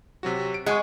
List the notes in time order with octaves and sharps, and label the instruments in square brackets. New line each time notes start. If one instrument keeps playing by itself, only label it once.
[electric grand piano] C3 F#3 F#4
D7
[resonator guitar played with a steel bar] G#3 [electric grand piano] F#5 G#5 C#6